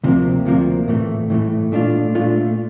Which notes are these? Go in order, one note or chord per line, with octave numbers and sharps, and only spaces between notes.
D2 C3 F3 A#3
D2 C3 F3 A#3
A2 E3 A3
A2 E3 A3
A#2 A3 D4 F4
A#2 A3 D4 F4